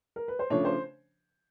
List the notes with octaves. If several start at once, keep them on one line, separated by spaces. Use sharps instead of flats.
A#4
B4
C5
C#3 F3 A3 D4 C#5
C5